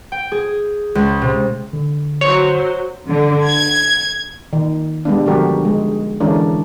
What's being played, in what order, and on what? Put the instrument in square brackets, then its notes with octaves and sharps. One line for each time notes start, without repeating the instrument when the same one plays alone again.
[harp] G5
G#4
C#2
C3
[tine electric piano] D3
[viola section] F#3 F#4 C5 [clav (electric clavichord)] C#5
[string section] D3
G#6
[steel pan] D#3
G3 G#3 B3 D4
D3 F3 F#4 G4 A#4
G#3
D3 E3 G#3 C#4 D4 A#4